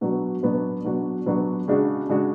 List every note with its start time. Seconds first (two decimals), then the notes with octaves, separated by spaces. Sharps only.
0.01 B2 F#3 B3 D4 F#4
0.43 B2 F#3 B3 D4 F#4
0.84 B2 F#3 B3 D4 F#4
1.26 B2 F#3 B3 D4 F#4
1.68 C#3 G#3 D4 F#4
2.09 C#3 G#3 D4 F#4